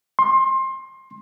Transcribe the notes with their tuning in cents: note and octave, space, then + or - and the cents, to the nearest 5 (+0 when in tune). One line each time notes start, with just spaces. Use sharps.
C6 +25